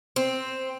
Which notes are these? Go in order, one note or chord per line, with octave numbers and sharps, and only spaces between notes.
C4